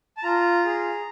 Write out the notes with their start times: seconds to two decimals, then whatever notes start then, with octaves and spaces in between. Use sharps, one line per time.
0.17 A5
0.23 F4 A#5
0.65 G#4